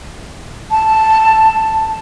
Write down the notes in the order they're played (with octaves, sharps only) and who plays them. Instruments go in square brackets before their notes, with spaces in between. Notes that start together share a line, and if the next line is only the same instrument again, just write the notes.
[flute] A5